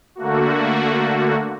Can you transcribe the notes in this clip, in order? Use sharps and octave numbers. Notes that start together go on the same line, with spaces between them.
D3 A3 A#3 F#4